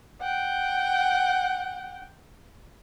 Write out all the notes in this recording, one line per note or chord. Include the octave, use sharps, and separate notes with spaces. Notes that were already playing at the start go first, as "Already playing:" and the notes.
F#5 G5